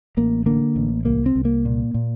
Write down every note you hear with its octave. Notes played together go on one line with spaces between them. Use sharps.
A1 A#3
D3 A#3
A1
C2 A#3
C4
C2
A#3
A#2
A#2